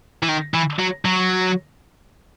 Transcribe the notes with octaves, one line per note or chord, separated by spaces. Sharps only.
E3
D#3
E3
F#3
F#3